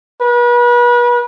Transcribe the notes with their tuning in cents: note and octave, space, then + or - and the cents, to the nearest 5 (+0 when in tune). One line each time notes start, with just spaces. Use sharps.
B4 -35